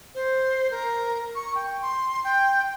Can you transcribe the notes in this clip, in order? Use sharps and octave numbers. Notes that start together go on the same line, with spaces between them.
C5
A#4
C#6
G5
C6
G5